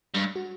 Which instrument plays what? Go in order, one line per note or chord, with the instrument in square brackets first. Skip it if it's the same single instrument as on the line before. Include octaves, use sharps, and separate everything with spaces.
[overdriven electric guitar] G2
[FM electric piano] F#4